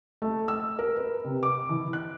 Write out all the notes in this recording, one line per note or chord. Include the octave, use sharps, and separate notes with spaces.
A3
E6
A#4
B4
C3
D6
E3
F#6